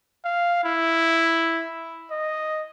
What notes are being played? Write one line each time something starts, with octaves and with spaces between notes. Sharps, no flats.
F5
E4
D#5